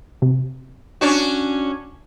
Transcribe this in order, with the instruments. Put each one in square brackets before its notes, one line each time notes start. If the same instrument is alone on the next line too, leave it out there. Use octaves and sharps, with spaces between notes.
[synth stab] C3
[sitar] C#4 D4 F#4